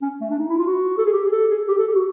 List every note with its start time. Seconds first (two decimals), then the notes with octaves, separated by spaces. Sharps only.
0.02 C#4
0.21 A3
0.31 D4
0.39 D#4
0.49 E4
0.58 F4
0.67 F#4
0.98 A4
1.06 G#4
1.12 G4
1.26 G#4
1.32 A4
1.50 G#4
1.68 G4
1.78 A4
1.87 G4
1.95 F#4